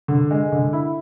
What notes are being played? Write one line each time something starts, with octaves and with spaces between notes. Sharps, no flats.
D3
G#3
D3
E4